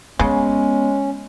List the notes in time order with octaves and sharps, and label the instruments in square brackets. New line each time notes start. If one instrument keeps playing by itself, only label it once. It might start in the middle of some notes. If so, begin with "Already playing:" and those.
[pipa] C#3 [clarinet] G#3 [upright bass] B3 [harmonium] C#4